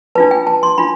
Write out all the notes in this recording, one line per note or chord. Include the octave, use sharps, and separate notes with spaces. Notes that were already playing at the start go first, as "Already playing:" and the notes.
D4 F4 B4 A5
G5
A5
C6
D4 F4 B5